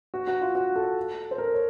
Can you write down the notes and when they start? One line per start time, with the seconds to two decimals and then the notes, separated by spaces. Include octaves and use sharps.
0.14 F#4
0.27 F#4
0.42 F4
0.55 F#4
0.76 A4
1.31 C5
1.38 A#4
1.54 C#5